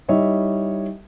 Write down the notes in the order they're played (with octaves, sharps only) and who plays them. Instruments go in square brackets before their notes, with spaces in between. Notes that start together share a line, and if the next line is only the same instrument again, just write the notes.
[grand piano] G3 D#4 E4 C#5 D#5 E5